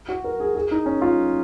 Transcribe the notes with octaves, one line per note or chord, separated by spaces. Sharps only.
F#4
A#4
G#4
G#4
D#4
C#4
F4